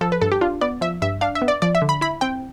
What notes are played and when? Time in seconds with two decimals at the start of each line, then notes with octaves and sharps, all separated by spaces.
0.01 F3 A4
0.12 B4
0.21 G2 A4
0.32 G4
0.41 D4 F4
0.61 B3 D5
0.81 F3 E5
1.02 G2 E5
1.21 D4 F5
1.35 E5
1.42 B3
1.48 D5
1.62 F3 D5
1.75 E5
1.82 D3
1.89 B5
2.01 E4 B5
2.21 C4 G5